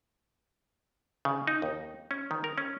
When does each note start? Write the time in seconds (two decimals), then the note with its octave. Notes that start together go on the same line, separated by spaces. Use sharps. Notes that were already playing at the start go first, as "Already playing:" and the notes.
1.25 C#3
1.47 D#4
1.62 D#2
2.11 C#4
2.31 D#3
2.44 A#4
2.58 C#4